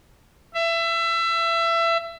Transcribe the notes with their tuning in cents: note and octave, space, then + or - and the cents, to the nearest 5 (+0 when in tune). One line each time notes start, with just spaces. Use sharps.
E5 +25